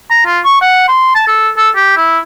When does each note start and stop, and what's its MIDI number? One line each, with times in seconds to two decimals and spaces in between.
0.11 0.25 82
0.26 0.40 65
0.45 0.56 85
0.61 0.86 78
0.88 1.11 84
1.15 1.24 81
1.28 1.50 69
1.57 1.70 69
1.76 1.95 67
1.97 2.19 64